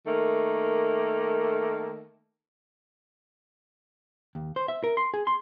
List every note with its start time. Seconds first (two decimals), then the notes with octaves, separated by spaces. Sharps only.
0.06 D#3 A3 A#3
4.35 D#2
4.56 C5
4.68 E5
4.84 A#4
4.97 C6
5.14 G#4
5.27 C6